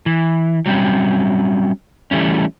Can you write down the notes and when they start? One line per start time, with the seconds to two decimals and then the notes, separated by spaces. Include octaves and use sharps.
0.06 E3
0.66 F#3 G3 C4 C#4
2.11 E3 G3 A3 C#4